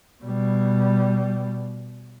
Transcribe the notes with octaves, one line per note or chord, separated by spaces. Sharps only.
B2 G3